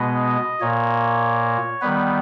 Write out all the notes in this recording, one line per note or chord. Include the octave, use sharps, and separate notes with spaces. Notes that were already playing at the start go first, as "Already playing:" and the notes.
Already playing: B2 G#3 B3 D#5
A#2 A#3 C#5
D#3 G3 B3 B4